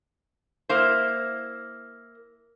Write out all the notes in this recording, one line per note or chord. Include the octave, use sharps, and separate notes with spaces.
A#3 E4 C5